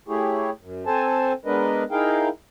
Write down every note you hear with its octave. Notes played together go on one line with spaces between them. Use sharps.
A3 E4 G4 G#4 C#5
F#2
C4 A4 C5 G#5 A5
G#3 B3 D4 A#4 B4 D#5
D#4 E4 G#4 A#4 F5 G5